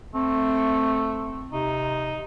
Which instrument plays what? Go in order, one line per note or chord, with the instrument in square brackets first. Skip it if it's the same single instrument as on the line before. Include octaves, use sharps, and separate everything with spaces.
[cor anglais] A3 [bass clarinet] C4
[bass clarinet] C3 [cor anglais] D#4